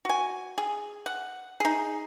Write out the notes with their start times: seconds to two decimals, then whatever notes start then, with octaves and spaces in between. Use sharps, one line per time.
0.05 F#4 G#5
0.58 G#4
1.06 F#5
1.60 D#4 G#4